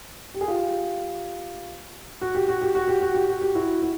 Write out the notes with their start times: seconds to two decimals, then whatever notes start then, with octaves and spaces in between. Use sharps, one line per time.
0.34 G4
0.41 G#4
0.48 F4 G4
2.21 F#4
2.35 G4
2.48 F#4
2.61 G4
2.75 F#4
2.88 G4
3.01 F#4
3.15 G4
3.28 F#4
3.41 G4
3.55 E4 F#4
3.82 E4